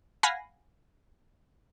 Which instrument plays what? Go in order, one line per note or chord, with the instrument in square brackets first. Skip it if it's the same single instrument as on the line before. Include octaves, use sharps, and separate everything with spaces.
[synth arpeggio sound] F5 F#5 G#5 B5 A#6 C7